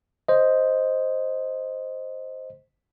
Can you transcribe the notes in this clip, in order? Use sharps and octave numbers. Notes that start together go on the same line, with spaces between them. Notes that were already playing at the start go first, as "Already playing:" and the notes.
C5 D#5